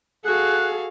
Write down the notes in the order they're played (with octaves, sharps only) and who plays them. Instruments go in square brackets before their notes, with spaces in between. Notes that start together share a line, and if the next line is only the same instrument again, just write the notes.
[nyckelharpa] F#4 F5 [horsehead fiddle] G#4 A4 [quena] F#6